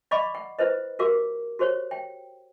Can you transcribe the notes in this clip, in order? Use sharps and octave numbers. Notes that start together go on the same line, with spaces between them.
D5 D#5 F5 B5 C#6 D6
F#5
E4 B4 C5 D#5
F#4 G4 A#4 F5 D6
F#4 G4 C5 C#5
G5